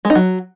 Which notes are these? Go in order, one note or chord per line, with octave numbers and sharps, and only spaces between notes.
G#3
D#4
F#3